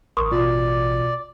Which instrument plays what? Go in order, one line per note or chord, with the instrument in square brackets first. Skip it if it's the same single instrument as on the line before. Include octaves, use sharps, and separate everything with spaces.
[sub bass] A1 [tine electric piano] A#4 [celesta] C6 C#6 D#6
[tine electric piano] B2 [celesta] F4 [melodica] D5